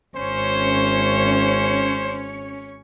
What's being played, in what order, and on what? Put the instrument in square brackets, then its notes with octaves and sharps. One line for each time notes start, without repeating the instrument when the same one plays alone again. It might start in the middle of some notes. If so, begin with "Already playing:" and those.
[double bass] G#1 [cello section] C#4 C#5 [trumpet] C5